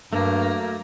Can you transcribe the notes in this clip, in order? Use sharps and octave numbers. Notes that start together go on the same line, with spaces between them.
G2 F#3 A3 A#3